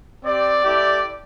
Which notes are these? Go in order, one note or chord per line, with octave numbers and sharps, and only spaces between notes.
C4 G4 D5
A3 E4 G4